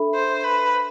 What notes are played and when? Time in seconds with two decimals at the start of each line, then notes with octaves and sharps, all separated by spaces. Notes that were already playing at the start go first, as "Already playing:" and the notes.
Already playing: D4 A4 E5 B5
0.15 C5
0.44 B4